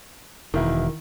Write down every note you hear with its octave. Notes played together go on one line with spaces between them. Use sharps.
E1 D#3 E3 E4